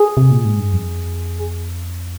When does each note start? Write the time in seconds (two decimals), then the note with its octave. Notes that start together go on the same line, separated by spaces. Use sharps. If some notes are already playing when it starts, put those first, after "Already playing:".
Already playing: G#4
0.17 C3
0.31 A#2
0.45 G#2
0.59 G2
0.73 F2